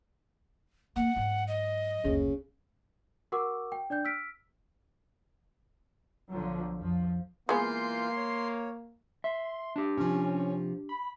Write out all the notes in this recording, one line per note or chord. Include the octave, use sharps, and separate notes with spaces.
A#3 F#5
G#2 F#3
D#5
F#1 D2 C#3
F#4 A#4 F#5 C#6 D6 E6
G5
D4 D5 G5 G6
E6 F6 B6 D7
B1 D3 F3 F#3
F2 F3
E3 G#3 A#3 B3 F4 C6 G6
C#5
E5 C6
D4 G4
C3 F3 C#4
B5